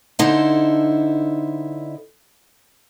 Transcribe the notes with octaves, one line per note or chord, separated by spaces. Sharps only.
D3 D#4 E4 A4 C5